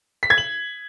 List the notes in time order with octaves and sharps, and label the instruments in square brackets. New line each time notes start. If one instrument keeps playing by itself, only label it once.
[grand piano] B6
G#6
F#7